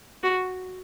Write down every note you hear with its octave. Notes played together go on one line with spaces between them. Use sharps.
F#4